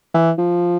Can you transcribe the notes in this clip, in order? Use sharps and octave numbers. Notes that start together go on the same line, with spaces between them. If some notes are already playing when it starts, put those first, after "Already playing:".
E3
F3